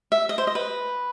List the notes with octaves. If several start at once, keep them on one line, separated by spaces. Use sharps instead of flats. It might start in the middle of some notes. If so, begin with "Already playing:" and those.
E5
D#5
C5
D#5
B4